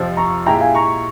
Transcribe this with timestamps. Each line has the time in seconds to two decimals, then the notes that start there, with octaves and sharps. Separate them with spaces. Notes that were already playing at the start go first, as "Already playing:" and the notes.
Already playing: F2 C3 F3
0.17 A#5 C#6
0.46 A#2 G#3 E4 G4 G5 A#5
0.61 F5 G#5
0.75 A#5 C#6